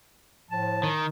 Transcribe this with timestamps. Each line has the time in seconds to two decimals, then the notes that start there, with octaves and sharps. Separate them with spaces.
0.51 A2 F3 A5
0.83 D#3